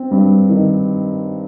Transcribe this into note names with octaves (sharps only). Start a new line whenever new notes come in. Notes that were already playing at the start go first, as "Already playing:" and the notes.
Already playing: C4
G2
D#3